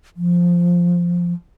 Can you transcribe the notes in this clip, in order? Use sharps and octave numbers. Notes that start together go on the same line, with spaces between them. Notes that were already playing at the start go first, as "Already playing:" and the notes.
F3